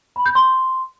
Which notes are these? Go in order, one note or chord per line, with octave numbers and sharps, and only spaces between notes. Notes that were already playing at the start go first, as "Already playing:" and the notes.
B5
G6
C6